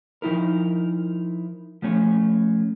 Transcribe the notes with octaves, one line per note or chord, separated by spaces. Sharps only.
F3 D#4 E4 A#4
F3 A3 C#4